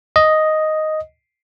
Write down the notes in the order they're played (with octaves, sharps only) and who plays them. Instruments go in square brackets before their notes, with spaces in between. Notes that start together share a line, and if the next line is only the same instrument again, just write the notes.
[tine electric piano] D#5